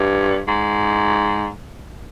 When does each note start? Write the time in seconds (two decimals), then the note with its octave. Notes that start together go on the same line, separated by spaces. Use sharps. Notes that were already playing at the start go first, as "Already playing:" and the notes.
Already playing: G2
0.48 G#2